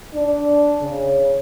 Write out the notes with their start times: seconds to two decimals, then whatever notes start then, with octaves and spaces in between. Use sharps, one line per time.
0.14 D4
0.82 C#3